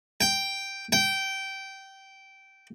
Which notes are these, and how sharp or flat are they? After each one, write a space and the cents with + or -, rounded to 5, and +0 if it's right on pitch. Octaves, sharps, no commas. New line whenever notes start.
G5 +0
G5 -15